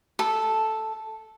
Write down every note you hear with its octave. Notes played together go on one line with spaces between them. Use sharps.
A4